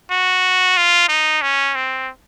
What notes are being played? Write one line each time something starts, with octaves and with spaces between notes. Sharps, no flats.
F#4
F4
D#4
C#4
C4